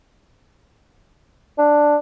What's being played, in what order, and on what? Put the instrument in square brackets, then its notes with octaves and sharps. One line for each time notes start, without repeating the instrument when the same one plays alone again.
[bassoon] D4